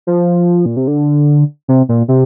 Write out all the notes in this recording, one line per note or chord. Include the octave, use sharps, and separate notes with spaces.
F3
A#2
C3
D3
C3
A#2
C3